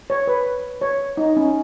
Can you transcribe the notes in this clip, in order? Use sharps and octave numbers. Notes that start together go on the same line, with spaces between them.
C#5
B4
C#5
D#4
C#4